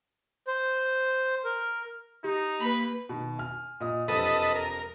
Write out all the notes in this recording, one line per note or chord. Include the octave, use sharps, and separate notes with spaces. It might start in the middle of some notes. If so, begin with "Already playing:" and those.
C5
A#4
D#4 G4
A#3 B4 B5
B2 D#3
G#5 F6
A#2 D#5 D#6
E1 F2 G4 A4 B4 D#5
A#4